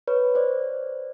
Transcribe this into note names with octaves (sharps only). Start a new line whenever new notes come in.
B4 C#5
C5 D5